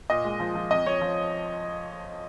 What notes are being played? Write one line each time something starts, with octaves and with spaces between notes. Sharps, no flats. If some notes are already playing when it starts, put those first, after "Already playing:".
A#2 D#5
G#3
F3
F3
F2 D#5
F2 C#5
F3